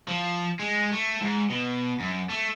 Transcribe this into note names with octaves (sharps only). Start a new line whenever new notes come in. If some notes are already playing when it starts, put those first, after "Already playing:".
F3
G#3
A3
G#2
B2
F#2
A3